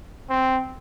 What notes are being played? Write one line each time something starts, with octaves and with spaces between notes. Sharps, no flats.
C4